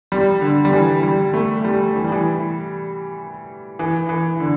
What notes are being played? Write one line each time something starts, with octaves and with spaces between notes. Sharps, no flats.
G3
D3
G3
E3
G3
A3
G3
E3
G3
E3
E3
E3
D3